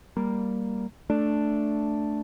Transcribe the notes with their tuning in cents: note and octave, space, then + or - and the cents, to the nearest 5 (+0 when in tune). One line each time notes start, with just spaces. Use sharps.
G3 +0 A#3 +0
A3 +0 D4 +0